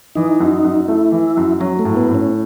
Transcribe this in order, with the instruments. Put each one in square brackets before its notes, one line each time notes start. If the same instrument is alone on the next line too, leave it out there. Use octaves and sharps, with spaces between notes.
[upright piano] E3 [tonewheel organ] D#4
[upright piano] F#2
F#2
[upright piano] A3 [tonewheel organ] E4
[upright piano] E3
F#2
[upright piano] F#3 [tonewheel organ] C#4
[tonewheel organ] A3
[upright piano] A2
[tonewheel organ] B3
[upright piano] A2
[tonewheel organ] C#4